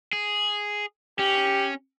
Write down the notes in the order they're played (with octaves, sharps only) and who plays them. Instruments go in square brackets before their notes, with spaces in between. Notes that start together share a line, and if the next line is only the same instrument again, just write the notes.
[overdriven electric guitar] G#4
[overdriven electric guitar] C#4 [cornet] G4